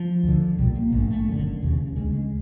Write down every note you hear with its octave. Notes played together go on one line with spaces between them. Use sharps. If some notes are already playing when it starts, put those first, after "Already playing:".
Already playing: F3
D2 D3
B1 A#2 G3
A#3
A#1 G#2 A3
A3
F#1 F#2 D3
E1 D#2 C#3
D2 C#3 G#3
G#3